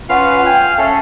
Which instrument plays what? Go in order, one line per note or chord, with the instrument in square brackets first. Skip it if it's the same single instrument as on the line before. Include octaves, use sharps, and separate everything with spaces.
[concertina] C#4 F4 B4 [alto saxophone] F5 [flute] F#5
[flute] G5 [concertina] G#5 F#6
[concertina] C#4 A4 [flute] E5